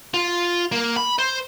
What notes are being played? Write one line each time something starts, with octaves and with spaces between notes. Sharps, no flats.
F4
A#3
B5
C5